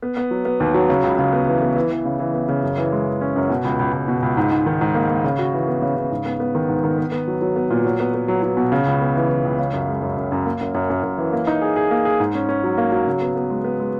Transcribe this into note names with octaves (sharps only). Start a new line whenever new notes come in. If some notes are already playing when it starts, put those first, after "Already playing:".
B3
B3
F#3
B3
D#2
F#3
C#3
C#2
C#3
B3
E3
B3
E3
E3
C#3
E3
B3
C#3
F#2
E3
G#3
E3
C#4
F#2
B2
C#2
C#2
C#2
B2
C#2
G#2
G#2
D#3
G#2
A#3
A#3
C#3
F#4
E3
B3
C#3
C#3
G#2
B3
B3
D#3
G#2
D#3
B3
B3
F#3
F#3
B3
A#2
F#3
B3
B3
F#3
F#3
B2
C#3
C#2
B3
E3
E3
C#2
C#3
F#2
G#3
F#2
F#2
F#2
A#3
F#2
F#2
F#2
F#2
E3
A#3
D#4
G#4
G#4
A#3
G#4
G#2
C#4
C#4
F#3
A#3
F#3
C#3
B3
B3
G#3
B3
G#3